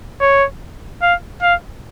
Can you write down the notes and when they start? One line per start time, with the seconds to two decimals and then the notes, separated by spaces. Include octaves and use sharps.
0.21 C#5
1.02 F5
1.42 F5